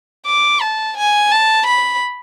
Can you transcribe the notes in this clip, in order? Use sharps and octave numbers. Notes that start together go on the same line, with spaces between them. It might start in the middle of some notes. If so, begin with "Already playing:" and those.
D6
A5
G#5
A5
B5